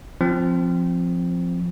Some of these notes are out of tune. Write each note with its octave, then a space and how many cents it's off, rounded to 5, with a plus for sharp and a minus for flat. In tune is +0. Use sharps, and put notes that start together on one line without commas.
F3 +0 C4 +0